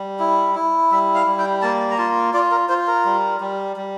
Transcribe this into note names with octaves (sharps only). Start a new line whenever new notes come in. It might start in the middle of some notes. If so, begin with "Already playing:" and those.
Already playing: G3
E4
E4
G3 E5
F5
G3
G5
A#3 A5
A#5
F4 A5
F4 D5
A#4
F4 C5
A#4
G3
G3
G3